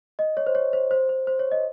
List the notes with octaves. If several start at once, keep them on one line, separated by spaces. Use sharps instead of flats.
D#5
C#5
C5
C#5
C5
C5
C5
C5
C#5
D#5